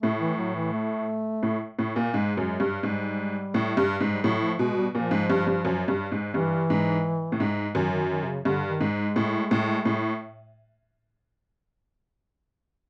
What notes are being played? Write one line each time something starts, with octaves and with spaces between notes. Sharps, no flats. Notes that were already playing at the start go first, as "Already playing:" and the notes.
A2 A3
E3
F#3
E3
A3
A2
A2
A#2
G#2 G#3
F#2
G2
G#2 G3
A2
G2
G#2
G3
A2 F#3
F3
B2 G#3
G3
A#2 F3
G#2
G2
G2
F#2
G2
G#2
G2 E3
G#2
A2
G#2
F#2 D#3
D#3
D#3
C3
C#3
G2 D3
D#3
G#2
G#3
A2
A2
A2